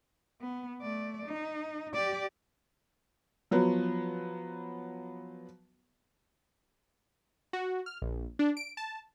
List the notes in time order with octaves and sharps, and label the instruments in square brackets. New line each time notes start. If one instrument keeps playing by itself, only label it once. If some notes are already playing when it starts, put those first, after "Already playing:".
[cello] B3
A3 D5
D#4
G4 D5
[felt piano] F3 F#3 B3
[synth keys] F#4
F6
A#1
D4
D7
A5